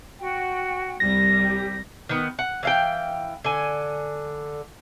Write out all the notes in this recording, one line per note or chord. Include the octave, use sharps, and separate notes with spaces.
F#4 G5
C2 G3 A#6
G4
D#3 B3
F#5
E3 F5 G5
D3 G#5